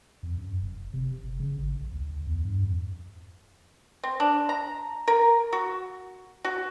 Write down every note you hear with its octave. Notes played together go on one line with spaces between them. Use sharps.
F2
F#2
F1
C3
F#1
C#3
G#1
A#1
D2
E2
G2
F2
C4
D4
A#5
A#4
F#4
F#4